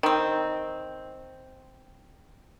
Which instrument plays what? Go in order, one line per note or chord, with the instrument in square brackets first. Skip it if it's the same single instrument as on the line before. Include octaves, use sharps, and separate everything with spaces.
[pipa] D#3 C4